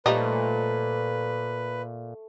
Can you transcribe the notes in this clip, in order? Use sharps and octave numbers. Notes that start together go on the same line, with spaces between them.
A#2 F3 G3 A3 D#4 B4